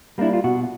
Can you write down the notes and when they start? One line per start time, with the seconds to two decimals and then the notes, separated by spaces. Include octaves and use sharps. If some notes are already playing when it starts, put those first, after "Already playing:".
0.18 G3 A#3 D4 E4
0.33 F4
0.44 B2 F#4